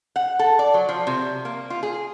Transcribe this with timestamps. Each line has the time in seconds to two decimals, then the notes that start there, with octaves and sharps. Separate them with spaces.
0.16 F#5
0.39 A4
0.59 D5
0.74 F#3
0.89 F3
1.07 C3
1.45 A#3
1.70 F4
1.83 G#4